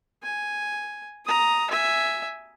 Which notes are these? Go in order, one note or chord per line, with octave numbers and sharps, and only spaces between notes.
G#5
A#5 D#6
E5 G#5